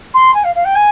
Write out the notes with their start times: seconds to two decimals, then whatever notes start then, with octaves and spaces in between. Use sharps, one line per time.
0.13 C6
0.34 G#5
0.43 F5
0.55 F5
0.64 G5
0.75 G#5